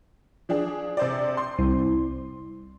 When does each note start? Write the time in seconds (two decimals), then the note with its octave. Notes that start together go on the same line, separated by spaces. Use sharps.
0.49 F3 D4 G#4
0.97 C3 C5 D5
1.37 C6
1.59 C2